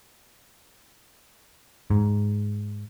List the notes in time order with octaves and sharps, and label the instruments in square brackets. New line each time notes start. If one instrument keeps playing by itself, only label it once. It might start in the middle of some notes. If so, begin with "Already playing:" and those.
[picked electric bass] G#2